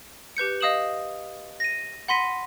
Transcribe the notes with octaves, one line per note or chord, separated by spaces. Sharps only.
G4 B4 G6 C#7
D#5 F5 D#6 E7 F#7
A#6 D#7
F#5 B5 C6 A#6 B6 D#7